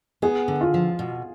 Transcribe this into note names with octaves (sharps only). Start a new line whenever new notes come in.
B3 G#4
D3
F4
F3
B2